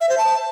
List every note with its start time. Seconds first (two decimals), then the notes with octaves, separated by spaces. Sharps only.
0.01 E5
0.09 C5
0.17 A5